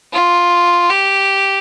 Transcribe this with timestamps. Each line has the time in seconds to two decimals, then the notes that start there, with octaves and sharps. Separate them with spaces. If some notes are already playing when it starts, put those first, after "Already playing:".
0.13 F4
0.90 G4